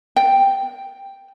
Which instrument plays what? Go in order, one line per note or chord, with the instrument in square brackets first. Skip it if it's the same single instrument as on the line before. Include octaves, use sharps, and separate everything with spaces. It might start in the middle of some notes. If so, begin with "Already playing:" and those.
[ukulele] G5